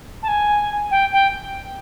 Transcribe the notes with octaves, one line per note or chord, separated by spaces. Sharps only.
A5
G#5
G5
G5